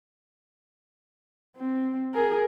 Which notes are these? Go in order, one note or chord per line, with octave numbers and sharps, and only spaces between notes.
C4
G#4 A#4